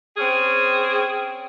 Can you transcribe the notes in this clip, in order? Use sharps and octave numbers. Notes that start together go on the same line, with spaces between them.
C4 C#4 G#4